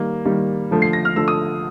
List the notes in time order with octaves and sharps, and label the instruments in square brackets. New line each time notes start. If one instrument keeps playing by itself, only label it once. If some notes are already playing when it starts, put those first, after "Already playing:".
Already playing: [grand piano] D#3 G3 A#3
D#3 G3 A#3
D3 F3 A3
C7
A#6
F6
D3 F3 A3 E6
D#6